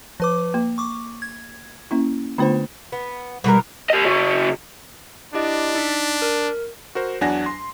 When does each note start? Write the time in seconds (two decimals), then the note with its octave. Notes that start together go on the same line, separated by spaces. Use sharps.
0.20 F3 B4 D6
0.54 A#3
0.78 C#6 D6
1.22 G#6
1.91 A#3 C#4 E4
2.38 D3 A3 B3 D4 F4 C5
2.92 B3
3.44 B2 E3 G3 A#4
3.90 G4 D#5
4.05 C#3 F#4
5.34 D4 E4 G4 D#5
5.75 D#4 B6
6.22 A#4
6.95 F#4 A#4 C5
7.21 E2 F#3 D4 F#5 G#5 A#6
7.46 C6